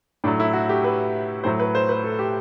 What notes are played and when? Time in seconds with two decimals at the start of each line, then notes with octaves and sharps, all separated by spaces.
0.24 A2 D4
0.27 F#3
0.40 E4
0.53 F#4
0.69 G4
0.84 B4
1.44 A2 F#3 C5
1.60 B4
1.75 C5
1.89 B4
2.04 A4
2.19 G4